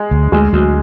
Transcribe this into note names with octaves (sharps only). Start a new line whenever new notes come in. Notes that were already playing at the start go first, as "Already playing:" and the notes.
Already playing: G#3
D2
D2 G#3
D2 F#3